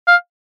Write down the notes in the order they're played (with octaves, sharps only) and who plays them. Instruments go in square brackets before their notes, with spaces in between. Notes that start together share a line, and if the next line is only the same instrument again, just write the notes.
[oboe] F5